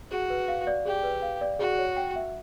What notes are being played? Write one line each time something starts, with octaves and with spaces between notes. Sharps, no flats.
F#4 G#4
B4
F5
D5
G4 G#4
B4
F5
D5
F#4 G#4
C#5
G5
E5